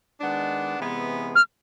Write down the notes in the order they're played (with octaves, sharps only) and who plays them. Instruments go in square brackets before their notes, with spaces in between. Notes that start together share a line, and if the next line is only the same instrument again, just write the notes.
[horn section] D#3 G#3 B3 D4
C3 E3 G#3 B3
[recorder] F6